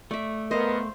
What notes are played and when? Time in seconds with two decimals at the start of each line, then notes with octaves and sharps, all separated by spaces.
0.11 A3 D5 E5
0.51 B3 A#4 C5 D#5 F5